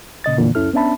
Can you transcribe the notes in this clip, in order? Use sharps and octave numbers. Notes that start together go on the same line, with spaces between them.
A#2 C#3 D#5 A6
F2 A#2 D3 E3 A#3
C#2 F#2 C#4 E4 A4 F6
B3 C#4 D4 E5 A5 B5